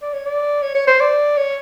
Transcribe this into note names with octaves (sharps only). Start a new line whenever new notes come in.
D5
C#5
D5
C#5
C#5
C5
D5
C#5